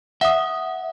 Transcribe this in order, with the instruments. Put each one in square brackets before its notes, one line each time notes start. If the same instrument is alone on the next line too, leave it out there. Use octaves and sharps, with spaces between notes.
[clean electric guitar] E5 [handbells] F#5 D#6